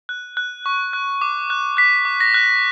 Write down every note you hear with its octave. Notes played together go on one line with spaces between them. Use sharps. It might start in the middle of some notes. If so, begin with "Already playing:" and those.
F#6
F#6
C#6
F#6
D6
F#6
F#6 B6
D6
A#6
F#6